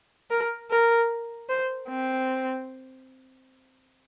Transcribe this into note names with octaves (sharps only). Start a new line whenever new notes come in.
A#4
A#4
C5
C4